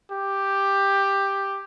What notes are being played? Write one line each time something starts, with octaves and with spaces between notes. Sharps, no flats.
G4